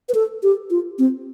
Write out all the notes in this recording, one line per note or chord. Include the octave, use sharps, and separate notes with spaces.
B4
A4
G4
F4
C4